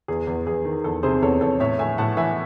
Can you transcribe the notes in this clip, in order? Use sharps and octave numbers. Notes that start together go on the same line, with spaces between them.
E2 G#4
E2
E2 G#4
D#3
E2 A4
C3 G#4 C5
E2 A4 C#5
E2 A4 C#5
A2 C#5 E5
A2 E5 G#5
A2 F#5 A5
E3 E5 G#5